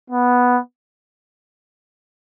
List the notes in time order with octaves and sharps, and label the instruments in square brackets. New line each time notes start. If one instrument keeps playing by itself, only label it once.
[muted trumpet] B3